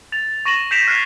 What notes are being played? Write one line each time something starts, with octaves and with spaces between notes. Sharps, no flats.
A6 F7
C#6 A#6 D#7 E7 F#7
G6 B6 C7 D7 E7 F7
F6 F#6 G#6 B6 C7 E7